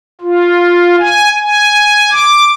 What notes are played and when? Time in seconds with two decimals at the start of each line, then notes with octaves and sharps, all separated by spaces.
0.21 F4
0.99 G#5
1.41 G#5
2.11 D6